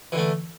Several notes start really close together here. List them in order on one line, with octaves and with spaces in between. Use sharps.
E3 D3 A3